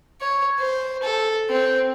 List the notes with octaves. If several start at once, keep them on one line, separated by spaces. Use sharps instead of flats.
C#5
C5
A4
C4